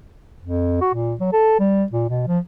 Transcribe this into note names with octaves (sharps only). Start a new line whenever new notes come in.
F2
F#4
A#2
F#3
A4
G3
A#2
B2
F3